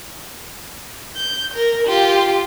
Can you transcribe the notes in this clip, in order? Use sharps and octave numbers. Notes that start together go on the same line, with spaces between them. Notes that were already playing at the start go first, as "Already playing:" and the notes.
G6
A#4
F4 G4